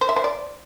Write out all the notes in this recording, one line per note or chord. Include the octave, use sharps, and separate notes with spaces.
C5
E5
C5
D5